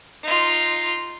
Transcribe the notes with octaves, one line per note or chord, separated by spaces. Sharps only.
D#4 F4